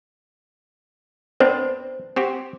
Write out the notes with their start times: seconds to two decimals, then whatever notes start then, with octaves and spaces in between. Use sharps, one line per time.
1.40 B3 C4 D4 C5
2.16 C4 F#4 G4